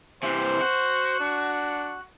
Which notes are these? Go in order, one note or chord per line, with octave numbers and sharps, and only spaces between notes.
C3 E3 C5
F#4
D4